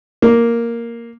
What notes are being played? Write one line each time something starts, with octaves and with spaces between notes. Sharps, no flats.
A#3